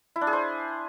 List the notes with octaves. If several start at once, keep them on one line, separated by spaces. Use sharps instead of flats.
E4
D4
G#4
C5